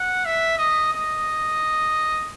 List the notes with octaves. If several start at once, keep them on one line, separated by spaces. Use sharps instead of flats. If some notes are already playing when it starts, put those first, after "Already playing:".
Already playing: F#5
E5
D#5
D#5